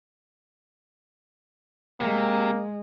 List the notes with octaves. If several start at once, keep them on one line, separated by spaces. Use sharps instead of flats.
C3 G#3 A#3